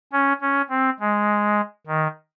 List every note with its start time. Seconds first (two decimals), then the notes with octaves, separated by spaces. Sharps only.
0.12 C#4
0.41 C#4
0.70 C4
1.00 G#3
1.87 D#3